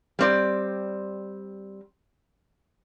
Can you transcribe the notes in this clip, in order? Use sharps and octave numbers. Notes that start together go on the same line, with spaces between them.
G3 C4 D5